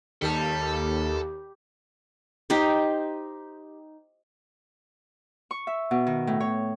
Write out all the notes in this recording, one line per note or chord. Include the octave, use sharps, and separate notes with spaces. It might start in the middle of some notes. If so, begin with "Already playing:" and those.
D#2 G3 A4 A5
D#4 G4 C5
C#6
E5
B2
D#3
A2
C#5